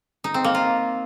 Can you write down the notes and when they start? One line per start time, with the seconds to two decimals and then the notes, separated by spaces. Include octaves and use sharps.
0.24 D#4
0.34 C4
0.44 A#3
0.55 F4